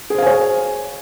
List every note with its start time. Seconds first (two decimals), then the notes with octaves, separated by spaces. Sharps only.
0.10 G#4
0.14 C5
0.18 F5
0.22 G#5
0.27 C#5